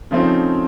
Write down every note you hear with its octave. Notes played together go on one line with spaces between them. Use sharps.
C#3 F3 A3 C4 D#4